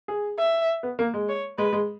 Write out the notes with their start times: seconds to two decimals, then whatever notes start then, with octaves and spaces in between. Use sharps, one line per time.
0.08 G#4
0.38 E5
0.83 B3
0.99 A#3
1.14 G#3
1.28 C#5
1.58 G#3 B4
1.73 G#3